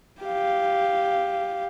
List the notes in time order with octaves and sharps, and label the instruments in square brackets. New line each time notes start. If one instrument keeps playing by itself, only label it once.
[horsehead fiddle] G4 F5